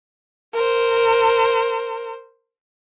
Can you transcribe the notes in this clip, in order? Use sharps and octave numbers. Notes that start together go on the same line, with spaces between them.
A#4 C5